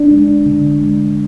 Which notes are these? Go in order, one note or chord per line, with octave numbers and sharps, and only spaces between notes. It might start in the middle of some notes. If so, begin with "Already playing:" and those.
Already playing: D4
G#3
D3
G#3